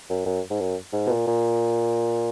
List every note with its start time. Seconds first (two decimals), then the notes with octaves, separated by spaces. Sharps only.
0.10 F#2
0.26 F#2
0.50 G#2
0.60 F#2
0.93 G#2
1.06 B2
1.10 A#2
1.27 A#2